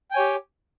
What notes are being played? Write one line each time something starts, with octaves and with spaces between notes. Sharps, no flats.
G4 C#5 G5 G#5